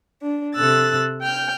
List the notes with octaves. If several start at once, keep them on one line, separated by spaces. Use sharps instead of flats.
D4
C3 A4 E6 F#6 A6
G5 F6 G6